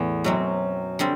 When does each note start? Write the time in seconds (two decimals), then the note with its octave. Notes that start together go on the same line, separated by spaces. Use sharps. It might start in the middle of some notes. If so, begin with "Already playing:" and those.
Already playing: E2 A2 E3
0.24 F#2 B2 F#3 C4
0.99 D3 G3 C4